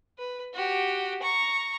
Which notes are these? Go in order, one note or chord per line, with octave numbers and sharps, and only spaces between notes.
B4
F#4 G4
A#5 C#6